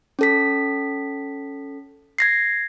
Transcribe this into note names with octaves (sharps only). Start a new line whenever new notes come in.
C#4 A4 B6
G#6 A#6 C7